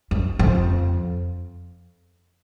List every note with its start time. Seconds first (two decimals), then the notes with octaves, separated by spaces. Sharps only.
0.11 F#2
0.39 F2